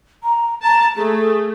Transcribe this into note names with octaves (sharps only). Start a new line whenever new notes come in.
A#5
A5 A#5
A3 G#4